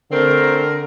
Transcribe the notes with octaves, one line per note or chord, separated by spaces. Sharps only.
D3 A3 C4 A#4